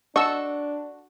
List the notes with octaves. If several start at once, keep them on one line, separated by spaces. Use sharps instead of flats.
D4 F#4 A4 D#5 C#6 E6